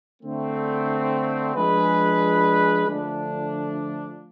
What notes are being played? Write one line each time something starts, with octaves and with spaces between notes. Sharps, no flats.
D3 A3 C4
F3 G#3 D4 G#4 B4
D3 F3 A3 D4